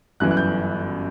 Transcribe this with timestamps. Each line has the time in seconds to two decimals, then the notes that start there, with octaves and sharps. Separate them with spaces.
0.20 G1 F#2 E3 F#6
0.31 F#6
0.37 G6